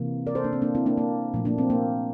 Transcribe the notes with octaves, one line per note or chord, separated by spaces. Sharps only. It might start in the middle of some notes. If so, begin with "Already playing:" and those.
Already playing: C3 E3 A#3
A#4 D5
A4 C5
A#3 D4
C4
A#3 D4
C4 E4
A#3 D4
A#3
A#2 F3 A3
A#3 D4
C4
A#3